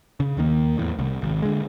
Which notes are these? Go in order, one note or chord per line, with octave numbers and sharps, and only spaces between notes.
C#3
D#2 D#3 A#3
E2 A2
C2
G#1
D3 G#3